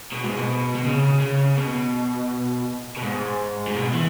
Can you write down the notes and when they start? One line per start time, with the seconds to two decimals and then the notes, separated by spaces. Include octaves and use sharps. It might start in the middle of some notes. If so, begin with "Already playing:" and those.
0.13 B2
0.24 G#2
0.37 B2
0.75 B2
0.85 C#3
1.21 C#3
1.58 B2
2.97 B2
3.03 G#2
3.67 G#2
3.75 B2
3.94 E3